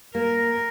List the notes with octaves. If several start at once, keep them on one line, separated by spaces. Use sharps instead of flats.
A#3 A#4